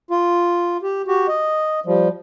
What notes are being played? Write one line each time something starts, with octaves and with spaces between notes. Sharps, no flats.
F4
G4
F#4 G4
D#5
F3 G3